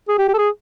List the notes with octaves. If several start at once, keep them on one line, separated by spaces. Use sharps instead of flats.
G#4
G4
G4
A4
G#4